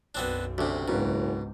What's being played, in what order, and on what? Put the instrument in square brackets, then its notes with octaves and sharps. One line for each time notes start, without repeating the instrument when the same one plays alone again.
[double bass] B1 F#2 [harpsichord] B3 C4 D4
[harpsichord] D2 C3 [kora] C#4 D4 G4
[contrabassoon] F#1 [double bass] C#2 G#2 [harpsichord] B2 [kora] F#4 G4 A#4